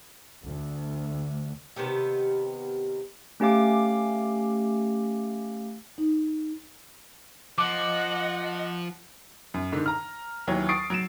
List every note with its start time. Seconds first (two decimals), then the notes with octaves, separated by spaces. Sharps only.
0.44 D2
1.76 C3 D#3 B3 G4
3.40 A3 C#4 G4 F5 D6
5.98 D#4
7.58 F3 D#5 F#5 D6
9.54 F#2
9.72 G#2 D3 D#3
9.86 A#5 F6
10.47 D#2 E3 F#3 C#5
10.69 C#6 D#6 A6 C7 D7
10.90 F#3 D7 E7